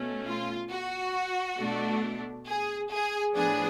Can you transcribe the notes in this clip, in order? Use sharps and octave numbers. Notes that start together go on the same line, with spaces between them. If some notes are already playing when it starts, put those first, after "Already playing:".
Already playing: B2 A3 C#4
F4
F#4
B2 A3 D4
G#4
G#4
A2 F3 B3 D4 G#4